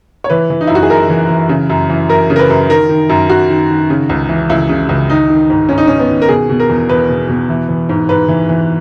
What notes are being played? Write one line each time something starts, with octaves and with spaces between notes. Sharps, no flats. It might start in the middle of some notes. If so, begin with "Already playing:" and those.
C#5
E3 B4
E3
D#4
F#2 E4
F#4
G#4
F#2 A#4
E3
E3
C#3
F#2
E3
F#2 A#4
C#3
A#4
B4
F#2
D#3 A#4
D#3
F#2
F#2 F#4
D#3
D#3
C#3
C#2
E3
C#2 E4
C#3
C#2
D#3 D#4
D#3
G#2
G#2 C#4
D#4
D#3 C#4
B3
D#3
A#4
B2 G#4
B2
A#4
E2
E2 B4
B2
B2
E3
E3
G#2
G#2 B4
E3
E3